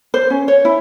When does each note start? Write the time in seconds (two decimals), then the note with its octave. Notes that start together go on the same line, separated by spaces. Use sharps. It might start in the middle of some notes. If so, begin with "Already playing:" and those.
0.14 C5
0.30 C#4
0.48 C#5
0.65 E4